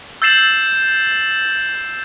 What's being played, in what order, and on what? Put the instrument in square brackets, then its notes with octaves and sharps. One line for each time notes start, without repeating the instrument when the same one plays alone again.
[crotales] E6 G6 A6 C7 E7 F#7